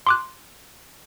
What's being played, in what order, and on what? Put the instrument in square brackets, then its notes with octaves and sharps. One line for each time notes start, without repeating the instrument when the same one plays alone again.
[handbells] C6 D6 F#6